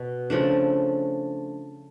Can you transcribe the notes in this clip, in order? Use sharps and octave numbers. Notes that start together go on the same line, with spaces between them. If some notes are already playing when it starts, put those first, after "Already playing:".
Already playing: B2
C#3 F3 A3 D4